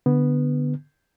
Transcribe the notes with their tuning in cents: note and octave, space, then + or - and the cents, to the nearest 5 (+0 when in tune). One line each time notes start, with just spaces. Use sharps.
D3 +0 B3 +0